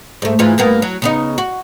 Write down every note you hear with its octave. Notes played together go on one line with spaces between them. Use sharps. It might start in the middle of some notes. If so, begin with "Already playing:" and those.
G#2 A3
G#2 E3 F4
G2 A#3 B3
F#3
C#3 B3 D#4
F#4